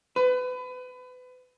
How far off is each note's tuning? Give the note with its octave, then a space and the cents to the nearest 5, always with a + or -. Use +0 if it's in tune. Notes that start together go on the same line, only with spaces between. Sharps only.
B4 +30